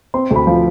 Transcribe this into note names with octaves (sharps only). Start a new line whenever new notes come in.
C4 C6
D2 B5
F3